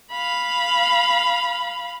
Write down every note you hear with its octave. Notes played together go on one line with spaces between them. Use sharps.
F5 B5